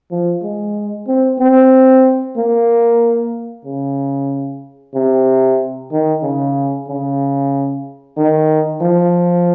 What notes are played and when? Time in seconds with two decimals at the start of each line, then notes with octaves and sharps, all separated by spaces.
0.11 F3
0.43 G#3
1.07 C4
1.40 C4
2.37 A#3
3.65 C#3
4.94 C3
5.92 D#3
6.23 C#3
6.88 C#3
8.17 D#3
8.81 F3